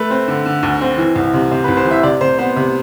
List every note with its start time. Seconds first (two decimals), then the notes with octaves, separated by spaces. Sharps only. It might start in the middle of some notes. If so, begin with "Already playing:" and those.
Already playing: A3 B4
0.10 C4
0.28 D3
0.46 D3
0.63 D2
0.81 C4
0.98 E3
1.16 C2
1.34 C3
1.51 C3 C5
1.64 B4
1.68 C2
1.77 C5
1.85 E3
1.91 E5
2.03 C3 D5
2.21 C3 C5
2.39 B3 C5
2.56 C3